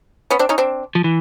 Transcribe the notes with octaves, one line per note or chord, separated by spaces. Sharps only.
B3 C#4
C4 D4
C#4 D#4
C4 D4
F3
E3